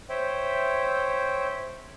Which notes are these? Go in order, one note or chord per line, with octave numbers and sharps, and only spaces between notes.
C5 C#5 E5 G5